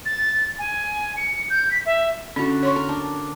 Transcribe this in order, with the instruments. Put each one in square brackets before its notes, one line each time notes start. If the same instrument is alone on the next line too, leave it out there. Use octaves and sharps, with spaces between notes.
[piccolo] A6
G#5
C#7
G6
B6
E5
[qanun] D3 F#4 [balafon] C#4
[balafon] C#5 C6 C#6
[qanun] A#4
D4